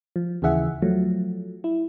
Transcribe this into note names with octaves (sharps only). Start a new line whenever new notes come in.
F3
D#2 C#3 E3 G#4 E5 F#5
F3 F#3 A3
E4